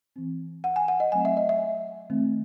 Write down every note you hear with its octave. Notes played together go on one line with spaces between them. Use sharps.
E3 C4
F#5
G#5
F#5
D#5
F#3 A3 C4 G#5
E5
D#5
E5
D#3 A3 C4